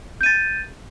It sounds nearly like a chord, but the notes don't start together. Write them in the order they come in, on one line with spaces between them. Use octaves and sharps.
G6 D#7 A6